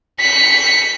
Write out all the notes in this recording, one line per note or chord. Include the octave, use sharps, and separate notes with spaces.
B6 C#7